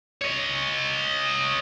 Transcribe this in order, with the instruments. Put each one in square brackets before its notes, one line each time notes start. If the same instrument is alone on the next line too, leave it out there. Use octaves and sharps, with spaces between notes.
[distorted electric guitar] C#5 D#5